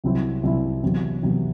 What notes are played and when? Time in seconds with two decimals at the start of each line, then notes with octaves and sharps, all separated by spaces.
0.04 C2 C3 F#3 C4 E4
0.43 C2 C3 F#3 C4 E4
0.83 E2 C3 F#3 B3
1.22 E2 C3 F#3 B3